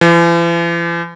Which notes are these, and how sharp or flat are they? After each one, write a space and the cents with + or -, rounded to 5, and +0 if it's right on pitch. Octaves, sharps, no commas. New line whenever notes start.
E3 +45